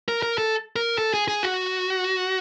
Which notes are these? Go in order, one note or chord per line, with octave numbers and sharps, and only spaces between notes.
A#4
A#4
A4
A#4
A4
G#4
G#4
F#4